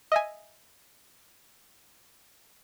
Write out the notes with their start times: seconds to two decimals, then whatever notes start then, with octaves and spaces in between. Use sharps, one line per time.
0.12 D#5 E5 G#5